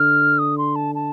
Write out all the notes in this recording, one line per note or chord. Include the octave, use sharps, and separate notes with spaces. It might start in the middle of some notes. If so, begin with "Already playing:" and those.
Already playing: D3 F6
D#6
C6
A5
A5